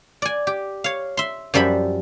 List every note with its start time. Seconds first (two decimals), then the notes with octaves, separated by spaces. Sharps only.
0.22 D5 G#5
0.47 G4
0.84 C#5 F5
1.17 E5 C6
1.54 F#2 F3 G3 E5 B5